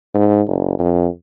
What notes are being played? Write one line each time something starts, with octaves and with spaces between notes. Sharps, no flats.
G#2
F#1
F2